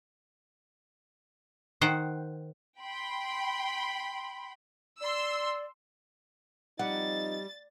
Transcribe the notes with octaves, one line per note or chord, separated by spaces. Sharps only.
D#3 C5 F#5 G5
G5 B5 C6
D5 C6 E6
F3 G3 C4 D#4 F#5 A6